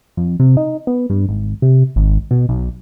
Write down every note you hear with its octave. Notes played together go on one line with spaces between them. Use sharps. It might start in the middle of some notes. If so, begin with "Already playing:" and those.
F2
C3
D#4
B3
G2
G#1
C3
G#1
B2
B1